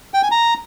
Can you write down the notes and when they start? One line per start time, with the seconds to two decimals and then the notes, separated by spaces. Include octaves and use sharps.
0.14 G5
0.23 G#5
0.31 A#5